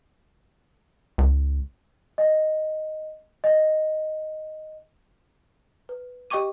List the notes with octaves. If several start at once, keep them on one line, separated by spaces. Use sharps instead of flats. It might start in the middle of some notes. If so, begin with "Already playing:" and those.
C#2
D#5
D#5
B4
G4 D#5 G5 C#6 D6 D#7